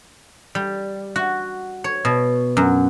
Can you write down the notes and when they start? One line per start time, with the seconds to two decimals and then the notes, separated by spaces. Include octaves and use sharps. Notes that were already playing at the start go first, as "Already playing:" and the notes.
0.55 G3
1.16 F#4
1.84 C#5
2.05 B2
2.57 F#2